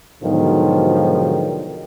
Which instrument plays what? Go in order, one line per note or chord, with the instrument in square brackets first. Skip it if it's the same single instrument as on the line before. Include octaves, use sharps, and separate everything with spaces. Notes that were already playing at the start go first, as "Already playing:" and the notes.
[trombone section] G#2 B2 D3 D#3 F3 F#3